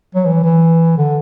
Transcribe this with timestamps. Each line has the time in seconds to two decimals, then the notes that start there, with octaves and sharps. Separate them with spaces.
0.15 F#3
0.26 E3
0.44 E3
0.98 D3